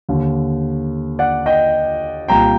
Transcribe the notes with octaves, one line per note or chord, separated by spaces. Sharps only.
D#2 D3
D5 F#5
D#5 G5
C2 A#2 G5 A#5